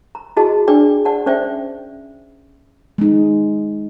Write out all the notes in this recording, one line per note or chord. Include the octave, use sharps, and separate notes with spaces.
A#5
E4 F#4 G#4 D#5 A5
D4 G#4 D5 G5
D5 F#5 A5
C#4 C5 D5 E5 G5
G#3 D#4